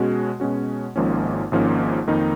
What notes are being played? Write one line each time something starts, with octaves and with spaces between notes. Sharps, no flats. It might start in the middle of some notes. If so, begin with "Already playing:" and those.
Already playing: B2 G#3 C#4 F#4
B2 G#3 C#4 F#4
G#1 G#2 F3 A#3 C#4
G#1 G#2 F3 A#3 C#4
F2 D#3 A#3 D#4